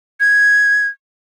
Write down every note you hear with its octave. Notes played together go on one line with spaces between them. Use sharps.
G#6